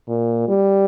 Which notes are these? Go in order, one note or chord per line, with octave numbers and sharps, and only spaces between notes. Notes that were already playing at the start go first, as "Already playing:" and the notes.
A#2
G3